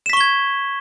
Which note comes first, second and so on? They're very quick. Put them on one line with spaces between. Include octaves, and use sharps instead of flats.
E7 B6 C#6 G7 G#6